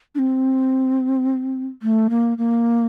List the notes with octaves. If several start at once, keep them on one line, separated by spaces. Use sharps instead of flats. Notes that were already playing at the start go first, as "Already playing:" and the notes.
D4
C4
A3
A#3
A#3